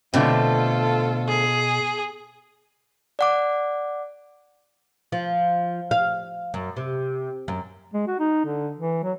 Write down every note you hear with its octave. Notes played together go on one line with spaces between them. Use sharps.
B2 D3 A3 C4 F4 A4
G#4
D5 F#5 D6
F3
F5
F#2
C3
F#2
G#3
F#4
D#4
D3
E3
F#3